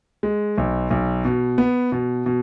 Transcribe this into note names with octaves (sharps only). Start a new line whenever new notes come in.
G#3
B1
B1
B2
B3
B2
B2